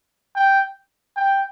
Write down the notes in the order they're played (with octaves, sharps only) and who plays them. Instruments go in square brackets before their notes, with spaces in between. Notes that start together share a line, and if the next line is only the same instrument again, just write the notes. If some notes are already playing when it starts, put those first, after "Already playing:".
[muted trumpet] G5
G5